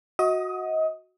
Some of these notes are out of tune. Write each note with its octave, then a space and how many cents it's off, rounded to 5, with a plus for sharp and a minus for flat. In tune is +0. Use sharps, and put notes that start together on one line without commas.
F#4 -10 D#5 +30 D#6 +0